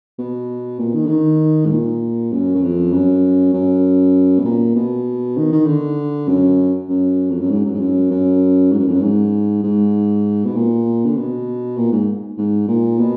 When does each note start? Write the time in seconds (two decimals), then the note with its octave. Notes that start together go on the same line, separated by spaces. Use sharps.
0.19 B2
0.79 A#2
0.94 D#3
1.06 D3
1.09 D#3
1.66 G#2
1.70 A#2
2.32 F#2
2.55 F#2
2.62 F2
2.93 F#2
3.53 F#2
4.39 B2
4.45 A#2
4.75 B2
5.37 D#3
5.52 D#3
5.67 D3
6.28 F#2
6.89 F#2
7.30 F2
7.40 F#2
7.50 G#2
7.65 F#2
7.74 G#2
7.80 F#2
8.11 F#2
8.72 G#2
8.79 F#2
8.87 F2
8.94 F#2
9.02 G#2
9.63 G#2
10.45 B2
10.55 A#2
11.05 D3
11.16 B2
11.77 A#2
11.92 G#2
12.38 G#2
12.68 A#2
12.99 B2